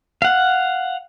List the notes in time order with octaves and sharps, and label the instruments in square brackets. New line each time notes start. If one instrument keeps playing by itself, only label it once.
[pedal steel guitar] F5 F#5